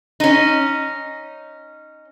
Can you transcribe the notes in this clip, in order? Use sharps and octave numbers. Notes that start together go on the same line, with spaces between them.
C#4 D#4